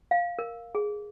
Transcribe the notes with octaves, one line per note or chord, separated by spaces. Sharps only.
F5
A#4
G#4